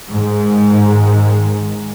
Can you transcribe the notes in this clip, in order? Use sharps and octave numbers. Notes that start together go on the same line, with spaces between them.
G#2 D#3 G#3